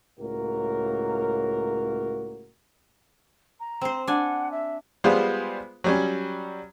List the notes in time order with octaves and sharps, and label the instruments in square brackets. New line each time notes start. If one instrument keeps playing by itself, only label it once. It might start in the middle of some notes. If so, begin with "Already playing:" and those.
[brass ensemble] C#2 A2 A#3 F#4 A#4
[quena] A#5
[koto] C4 C5
[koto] D4 G#5 [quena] F#5
[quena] E5
[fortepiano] G3 G#3 B3 F4 C5
F#3 G3 C#4